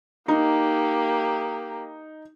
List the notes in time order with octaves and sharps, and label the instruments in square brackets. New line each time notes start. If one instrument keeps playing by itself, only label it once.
[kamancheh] A#3 G4 [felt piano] D#4